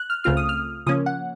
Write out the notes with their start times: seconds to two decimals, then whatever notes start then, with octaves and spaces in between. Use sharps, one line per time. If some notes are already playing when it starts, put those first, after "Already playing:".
Already playing: F#6
0.10 F6
0.24 C#2 C#3 A3 C4 F4 F6
0.37 D#6
0.49 F6
0.86 C#3 F3 A#3 C#4 D#6
1.06 F#5